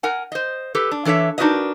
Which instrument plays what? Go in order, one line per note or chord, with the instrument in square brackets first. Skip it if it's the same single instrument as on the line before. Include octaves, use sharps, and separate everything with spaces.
[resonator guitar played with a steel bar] A#4 F#5 G#5
C5 D#5
G4 A4 B4
D4
E3 D4 A4 C#5 E5
D4 D#4 F#4 A#4 B4 D#5